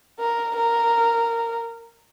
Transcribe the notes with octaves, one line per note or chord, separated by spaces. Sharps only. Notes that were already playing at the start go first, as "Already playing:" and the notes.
A#4
A#4